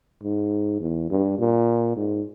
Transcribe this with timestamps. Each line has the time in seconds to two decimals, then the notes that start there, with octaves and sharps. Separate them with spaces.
0.24 G#2
0.80 E2
1.10 G2
1.39 A#2
1.97 G#2